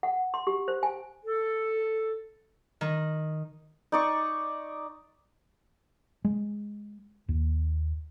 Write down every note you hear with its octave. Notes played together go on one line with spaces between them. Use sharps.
F#5
C6
G4
C5
G#5
A4
D#3
D#4 D5 C#6
G#3
D#2